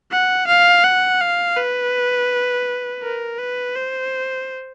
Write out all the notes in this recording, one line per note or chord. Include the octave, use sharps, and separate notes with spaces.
F#5
F5
F#5
F5
B4
A#4
B4
C5